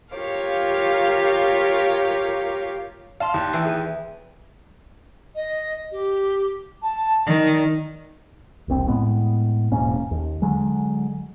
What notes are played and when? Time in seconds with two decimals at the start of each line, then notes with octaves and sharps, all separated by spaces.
0.16 F4 G4 A#4 C#5 F5
3.20 D5 F5 A5 C6
3.34 D#2
3.53 E3 G5
3.65 G#4 D#7
5.35 D#5
5.92 G4
6.83 A5
7.27 D#3 D5
8.68 E1 C2 C4
8.88 A2 G#3 B3
9.72 E1 G#2 A#3 C#4
10.11 D#2
10.42 D3 F#3 G#3